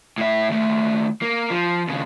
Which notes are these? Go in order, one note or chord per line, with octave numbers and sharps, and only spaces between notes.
A2 E5
D#2 A3
A#3
F3
D#2 C#3